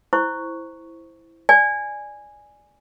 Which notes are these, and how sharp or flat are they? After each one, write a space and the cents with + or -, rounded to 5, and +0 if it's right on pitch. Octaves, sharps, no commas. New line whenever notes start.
E4 +0 C5 -5 C#6 +0
D5 +5 G#5 +0